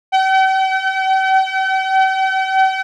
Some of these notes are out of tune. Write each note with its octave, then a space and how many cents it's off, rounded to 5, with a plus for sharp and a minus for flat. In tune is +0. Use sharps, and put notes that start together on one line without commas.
G5 -45